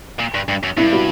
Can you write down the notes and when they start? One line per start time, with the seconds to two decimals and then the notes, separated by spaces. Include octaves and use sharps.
0.19 A#2
0.34 G2
0.48 G2
0.63 F#2
0.77 G2 E4
0.93 F#4